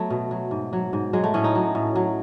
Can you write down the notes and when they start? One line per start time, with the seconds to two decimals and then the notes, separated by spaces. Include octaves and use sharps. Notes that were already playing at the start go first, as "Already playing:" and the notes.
Already playing: F#3 A3 B3
0.10 B2
0.31 F#3
0.51 G#2
0.73 F#3
0.93 G#2
1.13 F#3 G#3
1.24 A3
1.34 A2 C#4
1.44 D#4
1.55 F#3
1.75 A2
1.95 F#3